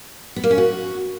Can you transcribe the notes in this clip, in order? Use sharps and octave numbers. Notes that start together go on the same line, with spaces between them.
B3
A#3
C#4
F#4